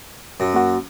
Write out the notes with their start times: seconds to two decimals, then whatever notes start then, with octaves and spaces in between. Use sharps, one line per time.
0.40 F#2
0.54 A#3 F#4